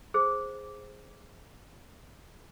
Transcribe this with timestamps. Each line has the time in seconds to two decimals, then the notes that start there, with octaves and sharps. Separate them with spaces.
0.14 G#4 C5